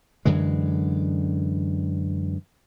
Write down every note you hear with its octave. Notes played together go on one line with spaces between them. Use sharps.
F#2 D3 E3 G#3